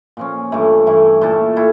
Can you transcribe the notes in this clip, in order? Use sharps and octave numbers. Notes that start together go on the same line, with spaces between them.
A#2 F3 C#4
G2 E3 A3 E4
G2 E3 A3 E4
A#2 A3 E4 A4
A#2 E4 A4